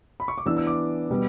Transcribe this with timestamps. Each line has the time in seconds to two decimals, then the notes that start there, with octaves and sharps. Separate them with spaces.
0.20 B5
0.28 C#6
0.38 D6
0.46 E3 B3 D4 E6
0.57 E6
0.67 D6
1.10 B2 G3 B3